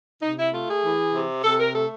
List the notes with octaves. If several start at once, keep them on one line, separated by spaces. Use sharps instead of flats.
C3 D#4
E4
A3 F4
G#4
E3
C3
C3 A4
A#4
A3 A4